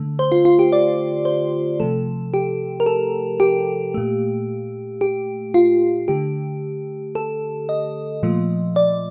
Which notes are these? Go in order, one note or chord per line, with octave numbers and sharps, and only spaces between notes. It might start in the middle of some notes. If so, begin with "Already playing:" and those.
Already playing: D3 A3
C5
F4
F4
G4
D5
C5
C3 F3 A3 A4
G4
A#4
A4
G4
A#2 A3
G4
F4
D3 A3 G4
A4
D#5
A#2 F3 A3
D5